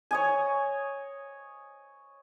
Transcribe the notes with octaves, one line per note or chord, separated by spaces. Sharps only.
C#5 D#5 G#5